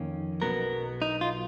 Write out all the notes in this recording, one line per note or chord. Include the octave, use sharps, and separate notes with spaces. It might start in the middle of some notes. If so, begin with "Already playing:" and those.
Already playing: F2 D#3 A#3 C#4
B1 B2 F#3 B3 A#4
D#4
F4